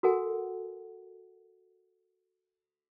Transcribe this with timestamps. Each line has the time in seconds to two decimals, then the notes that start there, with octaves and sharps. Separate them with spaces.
0.03 F#4 A4 A#4 F#5 G#5